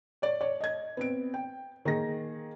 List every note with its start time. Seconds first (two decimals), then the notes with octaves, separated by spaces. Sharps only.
0.22 C#5 D5
0.41 C#5 D5
0.60 D#5 G#6
0.97 B3 C4 D7
1.34 G5
1.85 D#3 A#3 G#4 A#6